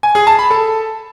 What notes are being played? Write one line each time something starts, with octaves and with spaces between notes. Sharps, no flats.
G#5
G#4
A5
B5
A4